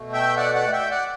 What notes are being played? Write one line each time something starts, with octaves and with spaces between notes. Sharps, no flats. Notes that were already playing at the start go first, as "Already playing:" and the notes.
Already playing: B2 A3
E5 G5
D5 F#5
D5 F#5
E5 G5
D5 F#5